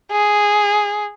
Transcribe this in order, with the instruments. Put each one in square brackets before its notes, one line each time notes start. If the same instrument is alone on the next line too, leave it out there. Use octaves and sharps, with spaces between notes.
[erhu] G#4